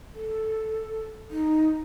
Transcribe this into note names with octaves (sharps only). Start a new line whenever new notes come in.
A4
D#4